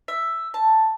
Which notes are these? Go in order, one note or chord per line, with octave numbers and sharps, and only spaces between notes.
E5
A5